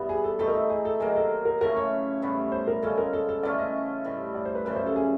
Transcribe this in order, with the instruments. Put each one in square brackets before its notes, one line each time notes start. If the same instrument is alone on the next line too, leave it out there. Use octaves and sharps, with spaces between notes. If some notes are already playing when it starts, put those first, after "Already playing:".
Already playing: [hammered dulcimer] G2 E3 G3 B3
[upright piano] G#4
A4
[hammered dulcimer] E3 A3 C4 D#4 [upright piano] A4
[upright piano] A#4
A4
G#4
A4
[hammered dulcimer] C3 D#3 F#3 A#3 [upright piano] G#4
[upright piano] A4
A#4
[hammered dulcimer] C#3 E3 A3 C#4 [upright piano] A#4
[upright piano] C#5
[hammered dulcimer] A2 E3 G3 B3
[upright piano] C5
A#4
[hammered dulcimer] C#3 F3 G#3 C#4 [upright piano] A4
[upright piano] A#4
A4
A4
[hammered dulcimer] E3 A3 C#4 F4 [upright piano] D5
[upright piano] D#5
[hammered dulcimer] A2 E3 G3
[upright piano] D5
C5
B4
[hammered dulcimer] F#2 C#3 E3 G3 [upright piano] B4
[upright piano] C5
A4
G#4